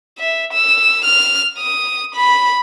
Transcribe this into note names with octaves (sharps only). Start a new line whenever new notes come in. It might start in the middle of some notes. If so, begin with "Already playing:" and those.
E5
E6
F6
D#6
B5